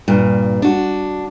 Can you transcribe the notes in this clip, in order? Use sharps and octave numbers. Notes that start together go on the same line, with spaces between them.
G2 A#2
D4 F#4